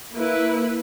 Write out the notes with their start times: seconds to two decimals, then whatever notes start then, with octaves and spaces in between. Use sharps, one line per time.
0.14 A#3 E4 B4